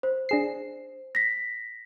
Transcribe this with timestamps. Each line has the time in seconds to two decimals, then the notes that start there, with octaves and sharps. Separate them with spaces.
0.03 C5
0.29 D4 G#4 C7
1.15 A#6 B6